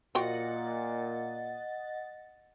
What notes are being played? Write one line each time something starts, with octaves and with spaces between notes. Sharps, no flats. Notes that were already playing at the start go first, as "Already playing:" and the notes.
A#2 F3 F#4 D#5 F#5 G5 A6